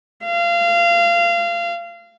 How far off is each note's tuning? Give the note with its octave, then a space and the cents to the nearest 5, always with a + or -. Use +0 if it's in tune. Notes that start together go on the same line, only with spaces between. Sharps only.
F5 -25